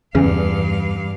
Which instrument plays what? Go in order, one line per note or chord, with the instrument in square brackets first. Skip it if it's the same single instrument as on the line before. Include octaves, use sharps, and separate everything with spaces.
[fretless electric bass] E2 [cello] G2 F5 [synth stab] C#3